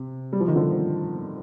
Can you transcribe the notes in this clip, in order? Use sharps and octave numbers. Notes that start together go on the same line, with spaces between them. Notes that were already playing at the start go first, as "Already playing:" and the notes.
Already playing: C3
G3
F3
D#3
D3 F3